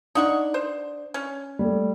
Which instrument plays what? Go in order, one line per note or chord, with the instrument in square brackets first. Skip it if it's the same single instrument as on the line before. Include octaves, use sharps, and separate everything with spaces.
[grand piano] D4 [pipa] D#4 F#5 C#6
[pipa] C5
C#4
[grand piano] G3 A3